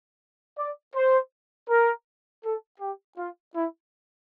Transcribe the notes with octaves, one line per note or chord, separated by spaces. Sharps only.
D5
C5
A#4
A4
G4
F4
E4